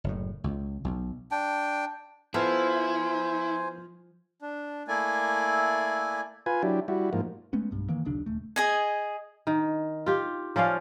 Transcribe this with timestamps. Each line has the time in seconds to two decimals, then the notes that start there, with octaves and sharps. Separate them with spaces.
0.04 F#1 A2
0.44 C#2
0.84 B1
1.31 D4 G5
2.34 F3 B3 E4 A4 C5 G#5
4.42 D4
4.88 A3 A#3 E4 D5 G#5
6.46 F4 B4 G#5
6.63 F#3 D4 E4 G4
6.88 G3 E4 F#4
7.13 G#2 F3 A#3
7.53 G#3 A3 B3 C#4
7.71 B1 G2
7.89 D#3 E3 A#3
8.05 D#1 B1 C#3 D4
8.26 D#1 A3
8.56 G#4 D#5 G#5
9.47 D#3
10.06 F4 G4
10.56 F3 C#4 D5 F5